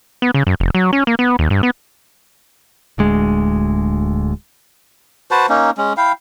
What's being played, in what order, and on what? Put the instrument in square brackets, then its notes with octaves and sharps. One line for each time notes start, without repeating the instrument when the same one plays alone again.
[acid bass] B3
C#3
F#2
F1
F#3
C#4
A#3
B3
D#2
G2
B3
[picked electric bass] D1 D2 G#3
[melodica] F#4 B4 C5 A5
A#3 C#4 D#4
G#3 C#4
E4 F5 G5